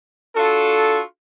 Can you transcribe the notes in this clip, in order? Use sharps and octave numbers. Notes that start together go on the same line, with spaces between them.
D4 F4 F#4 A4